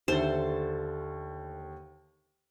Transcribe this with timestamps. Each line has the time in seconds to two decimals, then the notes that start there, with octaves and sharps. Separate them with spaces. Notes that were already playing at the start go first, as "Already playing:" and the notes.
0.08 D#2 D3 A3 A4 C5